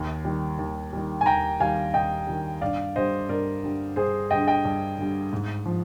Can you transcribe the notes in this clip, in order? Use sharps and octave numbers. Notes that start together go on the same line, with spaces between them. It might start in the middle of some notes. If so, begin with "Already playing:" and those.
Already playing: D#2
D#3 G3
D#2
D#3 G3
G#5
D#2 G5 A#5
D#3 G3 F5 G#5
D#2 D#5 G5
D#3 G3
G2 D5 F5
D3 G3 C5 D#5
G2 A#4 D5
D3 G3
G2 G#4 C5
D3 G3 D#5 G5
D#5 G5
G2
D3 G3
G#2
F3